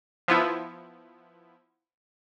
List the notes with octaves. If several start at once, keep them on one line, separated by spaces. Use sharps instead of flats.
F3 B3 E4